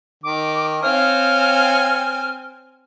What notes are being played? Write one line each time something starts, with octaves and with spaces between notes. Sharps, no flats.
D#3 D6
C4 C#5 F5 G#5 F6